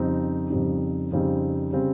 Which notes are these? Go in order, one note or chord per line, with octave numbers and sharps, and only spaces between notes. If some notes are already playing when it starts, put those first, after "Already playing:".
Already playing: F2 C#3 G3 C4 D#4
F2 C#3 G3 C4 D#4
F2 C#3 G3 C4 D#4
C#3 G3 C4